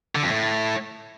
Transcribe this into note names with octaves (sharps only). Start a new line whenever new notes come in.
D3
F2
A2